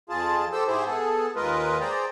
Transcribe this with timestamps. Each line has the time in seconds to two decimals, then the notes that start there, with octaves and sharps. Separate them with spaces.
0.09 F2 F4 G#4 A5
0.52 G4 A4 C5 E6
0.67 G#2 E4 G4 G#4 C5
0.85 B3 G#4 A4
1.36 D#2 G#3 F4 A#4 B4 D#5
1.80 G#4 C5 D5 G5 A#5